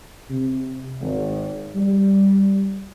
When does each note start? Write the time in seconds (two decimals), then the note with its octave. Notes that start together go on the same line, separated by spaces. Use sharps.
0.30 C3
1.01 G#1
1.75 G3